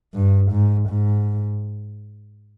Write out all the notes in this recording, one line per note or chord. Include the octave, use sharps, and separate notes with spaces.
G2
G#2
G#2